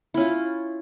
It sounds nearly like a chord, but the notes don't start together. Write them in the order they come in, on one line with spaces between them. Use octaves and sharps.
E4 C#4 F4